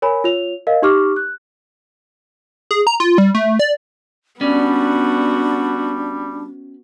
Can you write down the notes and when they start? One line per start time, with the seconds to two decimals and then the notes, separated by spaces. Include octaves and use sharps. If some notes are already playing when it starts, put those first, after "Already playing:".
0.02 A#4 C#5 G#5 B5
0.24 F4 C#5 F7
0.67 A#4 D#5 F5
0.82 D#4 G4 C#6 D6 F6
1.16 F#6
2.71 G#4
2.87 A#5
3.00 F4
3.18 G3
3.35 A3
3.59 D5
4.41 G3 B3 C#4 D4 F#4 D5